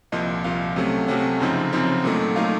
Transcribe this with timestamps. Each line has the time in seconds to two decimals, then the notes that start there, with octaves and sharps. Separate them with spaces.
0.12 C2 A#2 F3 D#5
0.44 C2 A#2 F3 F5
0.76 C3 F#3 A3 C#4
1.08 C3 F#3 A3 C#4 F#5
1.40 F#2 C#3 F3 C4 D#4
1.72 F#2 C#3 F3 C4 D#4
2.04 A#2 F#3 A3 D#4
2.36 A#2 F#3 A3 D#4 F5